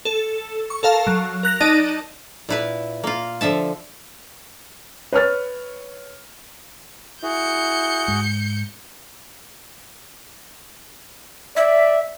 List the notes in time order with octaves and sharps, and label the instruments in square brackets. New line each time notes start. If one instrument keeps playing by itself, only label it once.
[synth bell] A4
C#6
A4 A#4 F5 A5
F#3
A#4 F#6 A#6 F7
D#4 D5 D#5 A5
[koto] A#2 E4 B4
A#3 F4
D3 F3 E5 A5
[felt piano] B4 C#5 F6 A6
[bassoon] E4 [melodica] F#4 G#4 [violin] G6 C#7
[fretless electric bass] G#2 G#3
[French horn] D5 [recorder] E5